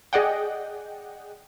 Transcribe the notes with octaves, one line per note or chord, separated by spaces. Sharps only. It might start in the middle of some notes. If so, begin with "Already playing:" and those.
G#4 D5 D#5 F#5 G5